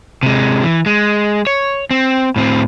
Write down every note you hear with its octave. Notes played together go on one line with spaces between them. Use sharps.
C3 G#3
E3
G#3
C#5
C4
A2 C4